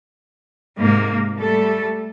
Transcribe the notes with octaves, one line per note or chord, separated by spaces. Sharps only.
G#2 C3 A#3
G3 A3 A4